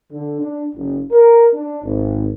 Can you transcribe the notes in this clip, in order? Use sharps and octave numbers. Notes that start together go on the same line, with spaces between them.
D3
D4
F#1
A#4
D4
G#1